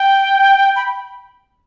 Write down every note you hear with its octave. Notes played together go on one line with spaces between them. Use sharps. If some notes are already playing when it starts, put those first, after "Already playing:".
Already playing: G5
B5